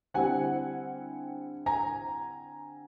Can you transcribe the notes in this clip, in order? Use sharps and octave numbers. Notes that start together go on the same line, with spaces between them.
D3 G3 C4 E4 F#5 G#5
G#5 A#5